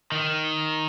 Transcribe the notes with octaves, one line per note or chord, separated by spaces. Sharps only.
D#3